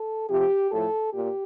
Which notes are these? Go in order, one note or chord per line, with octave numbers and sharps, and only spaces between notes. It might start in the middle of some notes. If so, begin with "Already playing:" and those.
Already playing: A4
C3 F3 G4
A2 F3 A4
A#2 G4